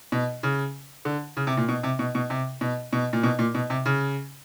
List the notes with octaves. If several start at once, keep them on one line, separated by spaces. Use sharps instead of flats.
B2
C#3
D3
C#3
C3
A#2
B2
C3
B2
B2
C3
B2
B2
A#2
B2
A#2
B2
C3
C#3